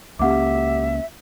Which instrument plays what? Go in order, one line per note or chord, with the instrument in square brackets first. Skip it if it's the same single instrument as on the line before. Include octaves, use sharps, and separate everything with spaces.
[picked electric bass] C#2 A#3 C#4 [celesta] G4 F#5 D6 [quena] E5